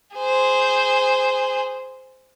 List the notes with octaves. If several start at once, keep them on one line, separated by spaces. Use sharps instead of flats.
G#4 C5